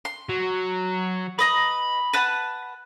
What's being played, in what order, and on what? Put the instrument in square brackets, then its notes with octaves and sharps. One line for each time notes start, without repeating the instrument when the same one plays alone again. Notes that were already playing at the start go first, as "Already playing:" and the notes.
[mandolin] C6
[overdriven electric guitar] F#3
[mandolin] B4 D#5 A#5 [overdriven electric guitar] B5
[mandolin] B4 F#5 A5